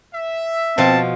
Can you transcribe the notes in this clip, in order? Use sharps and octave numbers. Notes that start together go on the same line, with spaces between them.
E5
B2 F3 C4 F4 A5